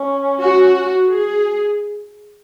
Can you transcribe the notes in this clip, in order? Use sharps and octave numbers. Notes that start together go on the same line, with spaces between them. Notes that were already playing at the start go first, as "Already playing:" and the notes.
Already playing: C#4
F#4
G#4